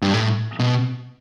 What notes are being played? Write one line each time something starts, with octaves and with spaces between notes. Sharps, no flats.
G2
A2
B2